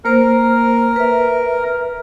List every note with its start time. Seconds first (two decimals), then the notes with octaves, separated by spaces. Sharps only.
0.05 A#3 A#4 C5
0.96 B4 E5